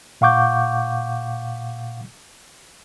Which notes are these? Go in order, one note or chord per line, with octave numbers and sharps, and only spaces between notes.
A#2 F5 F#5 C#6 D6 G6